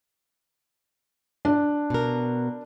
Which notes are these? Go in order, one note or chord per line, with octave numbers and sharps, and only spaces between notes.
D4
B2 A#4